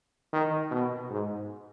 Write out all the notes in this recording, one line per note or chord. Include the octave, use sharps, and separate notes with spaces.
D#3
B2
G#2